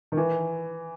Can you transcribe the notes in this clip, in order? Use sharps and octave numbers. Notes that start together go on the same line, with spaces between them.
D#3
E3